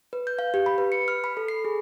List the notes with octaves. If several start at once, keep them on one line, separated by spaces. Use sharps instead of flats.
B4
G6
F5
G4
B5
B4
C#7
F6
B5
A4
C7
G#4